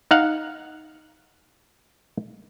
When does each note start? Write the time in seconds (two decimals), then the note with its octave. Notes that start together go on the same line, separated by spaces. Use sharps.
0.11 D#4 F5 F#5